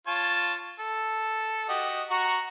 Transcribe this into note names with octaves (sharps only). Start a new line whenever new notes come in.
F4 C#5 A5
A4
F#4 G4 D#5
F#4 A#5 C#6